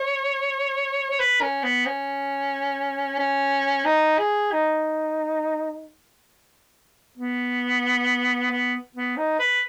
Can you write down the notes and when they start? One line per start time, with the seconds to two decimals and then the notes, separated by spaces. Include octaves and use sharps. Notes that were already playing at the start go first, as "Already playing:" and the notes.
Already playing: C#5
1.10 C#5
1.20 B4
1.42 C#4
1.63 B3
1.86 C#4
3.19 C#4
3.85 D#4
4.19 G#4
4.52 D#4
7.18 B3
8.51 B3
8.95 B3
9.17 D#4
9.39 B4